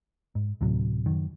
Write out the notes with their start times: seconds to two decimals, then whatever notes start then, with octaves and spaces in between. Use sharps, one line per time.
0.35 G#2
0.61 D2 A2 C3 F#3
1.06 F#1 F#2 D#3